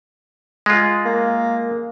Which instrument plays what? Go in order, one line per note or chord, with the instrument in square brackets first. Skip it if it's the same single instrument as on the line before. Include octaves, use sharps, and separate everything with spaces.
[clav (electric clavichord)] G#3 F4
[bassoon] A#3